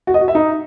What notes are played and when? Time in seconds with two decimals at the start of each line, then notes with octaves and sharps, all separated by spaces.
0.07 F#4
0.14 D#5
0.21 F#4
0.28 E5
0.35 D#4